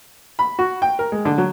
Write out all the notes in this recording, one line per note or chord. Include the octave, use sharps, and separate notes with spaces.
B5
F#4
G5
A#4
G#3
D3
F#3